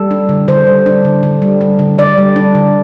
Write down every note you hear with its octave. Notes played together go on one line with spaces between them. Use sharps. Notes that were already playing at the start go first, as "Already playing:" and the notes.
Already playing: G3 A4
D4
D3
D3 C5
G3
D4
D3
D3
G3
D4
D3
D3 D5
G3
D4
D3